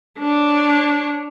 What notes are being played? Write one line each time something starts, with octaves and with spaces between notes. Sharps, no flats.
D4 C#5